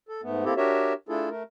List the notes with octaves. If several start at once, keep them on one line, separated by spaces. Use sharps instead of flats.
A4
G#2 A3 B3
A#3 C4 E4 G4 A4
D4 F#4 G4 A#4 C#5 E5
A3 D4 E4 F4 G#4 A4
A3 A#4